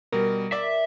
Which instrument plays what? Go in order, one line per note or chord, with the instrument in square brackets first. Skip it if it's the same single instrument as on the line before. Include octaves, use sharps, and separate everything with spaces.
[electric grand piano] B2 G3 [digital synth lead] A#4
[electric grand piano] D5 [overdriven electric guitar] E5